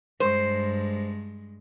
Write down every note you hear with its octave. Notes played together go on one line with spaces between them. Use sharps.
G2 G#3 C5